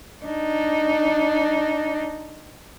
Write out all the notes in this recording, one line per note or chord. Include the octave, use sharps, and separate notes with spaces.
D4 D#4